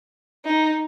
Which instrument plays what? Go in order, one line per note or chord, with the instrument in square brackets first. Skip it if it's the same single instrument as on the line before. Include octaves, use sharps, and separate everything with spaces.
[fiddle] D#4